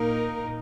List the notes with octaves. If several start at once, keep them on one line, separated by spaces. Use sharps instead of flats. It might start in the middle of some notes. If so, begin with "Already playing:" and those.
Already playing: A#2 A#3 D#4 A#4